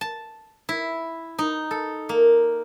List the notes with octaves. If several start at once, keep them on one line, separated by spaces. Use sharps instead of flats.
A5
E4
D#4
A4
A#3